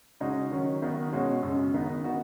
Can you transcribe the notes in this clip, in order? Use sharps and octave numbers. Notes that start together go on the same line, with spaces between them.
C#3 G#3 D#4 F#4
D#3 F#3 C#4
D#3 B3 D#4 F#4
B2 G#3 C#4 F#4
F#2 C#3 G#3
D#3 B3 D#4
D#3 B3 D#4 F#4